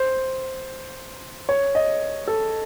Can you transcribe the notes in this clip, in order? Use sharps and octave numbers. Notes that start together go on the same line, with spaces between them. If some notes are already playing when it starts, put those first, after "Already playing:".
Already playing: C5
C#5
D#5
A4